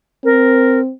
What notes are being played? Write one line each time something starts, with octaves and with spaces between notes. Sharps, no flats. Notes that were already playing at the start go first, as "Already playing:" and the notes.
C4 A#4